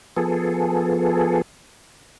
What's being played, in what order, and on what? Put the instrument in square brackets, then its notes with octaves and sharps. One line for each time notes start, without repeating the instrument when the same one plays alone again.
[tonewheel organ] F3 B3 G#4 A4